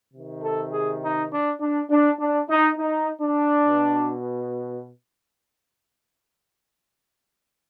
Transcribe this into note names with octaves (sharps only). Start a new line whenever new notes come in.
C3 D#3
A4
G#4
D#4
D4
D4
D4
D4
D#4
D#4
D4
B2